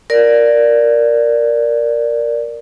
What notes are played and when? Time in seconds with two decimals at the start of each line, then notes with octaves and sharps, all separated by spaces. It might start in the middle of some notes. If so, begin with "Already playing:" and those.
0.10 A#4 D5